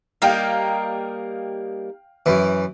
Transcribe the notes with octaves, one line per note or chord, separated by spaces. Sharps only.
G3 A#3 D#4 F5 G5
F#2 E3